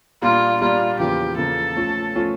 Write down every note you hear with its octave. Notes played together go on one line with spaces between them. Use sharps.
A#2 G3 A#3 D4 F4
A#2 G3 A#3 D4 F4
E2 C#3 F3 A#3 G4
E2 C#3 F3 A#3 A4
F3 A3 C#4 F4
F3 A3 C#4 F4